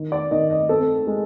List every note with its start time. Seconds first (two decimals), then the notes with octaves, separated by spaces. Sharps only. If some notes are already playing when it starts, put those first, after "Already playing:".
Already playing: D#3
0.12 D5
0.31 D#3 D#5
0.50 D#5
0.69 C4 A4
1.07 G#3